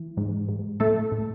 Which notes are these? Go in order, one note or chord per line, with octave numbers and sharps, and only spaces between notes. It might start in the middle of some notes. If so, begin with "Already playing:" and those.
Already playing: E3
G#2
G#2
A2 A3 A4
A2